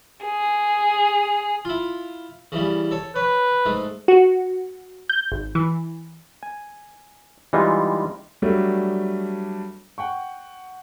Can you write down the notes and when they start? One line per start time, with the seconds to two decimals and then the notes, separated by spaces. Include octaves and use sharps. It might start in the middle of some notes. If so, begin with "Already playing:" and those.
0.23 G#4
1.65 E4 F4
2.52 C#3 E3 G3
2.91 A4 C#5
3.16 B4 C#5
3.66 G#2 A3
4.08 F#4
5.09 G6
5.32 G#1
5.55 E3
6.43 G#5
7.53 E3 G3 G#3 D#4 F4
8.42 F#3 G3 A3 D4
9.98 F#5 G5 C#6